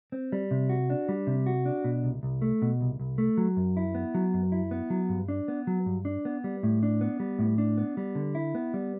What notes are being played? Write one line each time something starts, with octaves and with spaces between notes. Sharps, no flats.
C4
G3
C3
F#4
D4
G3
C3
F#4
D4
B2
C2
C2
A3
B2
C2
C2
A3
F#3
F#2
E4
B3
F#3
F#2
E4
B3
F#3
G2
D4
B3
F#3
G2
D4
B3
G3
A2
D4
B3
G3
A2
D4
B3
G3
D3
E4
B3
G3